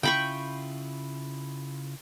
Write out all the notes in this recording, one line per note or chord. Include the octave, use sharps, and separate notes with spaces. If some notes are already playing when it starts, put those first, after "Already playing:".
C#3 E4 F4 G5 B5 C#6